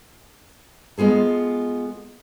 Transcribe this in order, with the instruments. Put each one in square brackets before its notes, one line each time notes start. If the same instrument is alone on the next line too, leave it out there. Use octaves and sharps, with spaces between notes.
[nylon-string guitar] G#3 B3 F4 G#4 A4